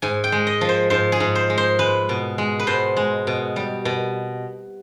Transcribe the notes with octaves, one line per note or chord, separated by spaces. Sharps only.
G#2 G#5
G5
G#3
D#5
F3
C5
G#2 C5
G#4
G#2
C5
G#3
C5
G#3 B4
B2
G#3
B4
B2 C5
G#3
B2
G3
B2